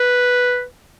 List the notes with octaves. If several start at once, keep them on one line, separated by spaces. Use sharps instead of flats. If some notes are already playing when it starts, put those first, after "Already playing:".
Already playing: B4